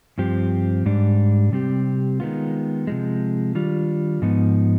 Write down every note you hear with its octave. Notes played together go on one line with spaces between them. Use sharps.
G2 F3 C4 G4
G#2 G3 D4
C3 G3 C4 G4
D#3 G#3 B3 F4
C3 F3 G#3
D#3 G3 D4 F4
G#2 F3 B3 D#4